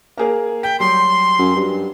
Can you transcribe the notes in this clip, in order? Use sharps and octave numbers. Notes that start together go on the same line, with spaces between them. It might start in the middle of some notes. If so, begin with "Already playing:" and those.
A#3 G#4 A#4
G5 B6
F#3 G3 C6
F#2
G2